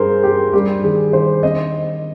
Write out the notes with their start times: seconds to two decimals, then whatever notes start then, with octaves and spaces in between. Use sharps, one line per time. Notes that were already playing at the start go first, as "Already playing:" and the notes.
Already playing: G2 G3 G#4 A#4 C5
0.23 G2 G4
0.53 G3 G4
0.83 D#3 G#4
1.13 D#3 C5
1.43 C4 D#5